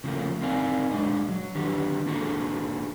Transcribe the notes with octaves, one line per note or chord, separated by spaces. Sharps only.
C#3 F3 A3 A#3
C4 D#4 A#4 D5 F5 G#5
F#2 G#3 D4 D#5
F#3
D3 D#3 F#3 D4 G4 B4
A#3 D4 F#4 G#4 A4